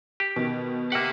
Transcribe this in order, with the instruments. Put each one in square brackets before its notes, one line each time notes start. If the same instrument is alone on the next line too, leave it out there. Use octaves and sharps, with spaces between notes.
[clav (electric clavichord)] G4
[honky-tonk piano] B2 D#3
[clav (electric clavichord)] A#3 F#5 [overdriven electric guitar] G4 E5